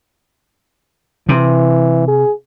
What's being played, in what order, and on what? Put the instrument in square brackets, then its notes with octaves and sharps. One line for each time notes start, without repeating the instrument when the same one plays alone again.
[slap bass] C3 [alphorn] E3
[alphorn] G#4